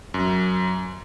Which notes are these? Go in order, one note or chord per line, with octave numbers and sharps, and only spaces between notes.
F#2